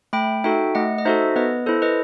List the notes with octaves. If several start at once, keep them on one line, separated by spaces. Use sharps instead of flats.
A3 G5 B5
D#4 F#4 A4 E5 G5
A3 D#5 F#5
D#5
D#4 F#4 A4 C5 E5
B3 B4 D#5
E4 A4 C5
B4 D#5